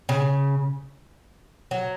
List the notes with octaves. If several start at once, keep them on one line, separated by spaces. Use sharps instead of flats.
C#3
F#3